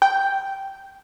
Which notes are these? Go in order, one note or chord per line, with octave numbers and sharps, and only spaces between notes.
G5